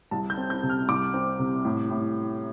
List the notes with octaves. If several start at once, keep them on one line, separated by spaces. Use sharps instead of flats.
C2 A5
G6
C4
G6
C3
F6
C2 D6
C4
C3
A2
A2